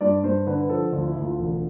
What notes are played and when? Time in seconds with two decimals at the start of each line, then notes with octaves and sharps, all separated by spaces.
0.01 G2 D5
0.24 G2 C5
0.47 D3 B4
0.69 F3 A4
0.92 D2 F4
1.07 E4
1.16 D2
1.24 F4
1.39 E1